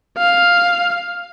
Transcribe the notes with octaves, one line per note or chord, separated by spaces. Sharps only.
F5